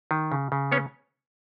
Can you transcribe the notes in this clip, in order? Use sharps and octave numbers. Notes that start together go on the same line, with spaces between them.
D#3
C#3
C#3
B3 C#4 C#5